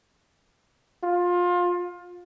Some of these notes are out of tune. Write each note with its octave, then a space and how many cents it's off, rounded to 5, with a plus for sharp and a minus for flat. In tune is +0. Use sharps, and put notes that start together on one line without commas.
F4 +20